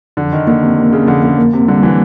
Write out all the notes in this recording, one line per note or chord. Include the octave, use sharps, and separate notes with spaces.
F2 D3
D#3
D3 A#3
C3
C3 A#3
C#3
F2 D3
C#3
A#3
C3
D3 G3
E3